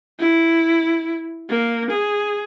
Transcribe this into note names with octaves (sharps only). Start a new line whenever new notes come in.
E4
A#3
G#4